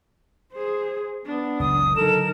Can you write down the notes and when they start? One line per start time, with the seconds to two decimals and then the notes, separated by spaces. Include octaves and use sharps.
0.53 G#4 C5
1.26 B3 D4
1.60 F#1 C#2 D#6
1.96 D3 F#3 D#4 A4 A#4 E7